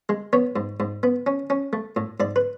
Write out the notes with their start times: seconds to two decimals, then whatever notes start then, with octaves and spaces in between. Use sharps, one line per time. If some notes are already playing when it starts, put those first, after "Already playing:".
0.09 G#3
0.33 B3 C#5
0.56 G#2
0.80 G#2
1.03 B3
1.27 C#4
1.50 C#4
1.73 A3
1.96 A2
2.20 G#2 D5
2.36 B4